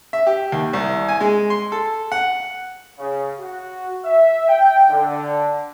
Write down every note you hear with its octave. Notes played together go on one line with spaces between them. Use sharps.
E5
G4
D#2
C2
G#5
G#3
C6
A4
F#5
C#3
F#4
E5
G5
D3